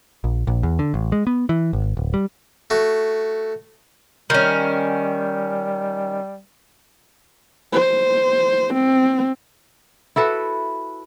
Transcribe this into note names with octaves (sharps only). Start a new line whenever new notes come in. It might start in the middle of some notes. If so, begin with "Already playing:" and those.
A#1
A#1
E2
D3
A1
G#3
B3
E3
G#1
D1
G3
A3 F#4
D#3 G3 C#4
C5
C4
E4 F#4 A4 B4